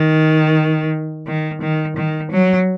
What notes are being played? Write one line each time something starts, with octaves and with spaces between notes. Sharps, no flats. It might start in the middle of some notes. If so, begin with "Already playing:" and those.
Already playing: D#3
D#3
D#3
D#3
F#3